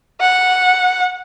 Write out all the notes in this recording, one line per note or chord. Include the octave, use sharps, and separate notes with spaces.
F#5